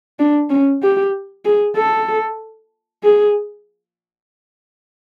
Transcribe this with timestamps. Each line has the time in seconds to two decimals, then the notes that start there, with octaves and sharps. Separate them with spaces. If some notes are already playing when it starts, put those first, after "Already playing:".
0.19 D4
0.50 C#4
0.83 G4
1.45 G#4
1.77 A4
3.04 G#4